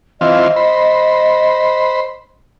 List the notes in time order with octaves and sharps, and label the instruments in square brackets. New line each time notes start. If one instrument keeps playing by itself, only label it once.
[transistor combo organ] E3 C4 F4 [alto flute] D#5
[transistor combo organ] C5 B5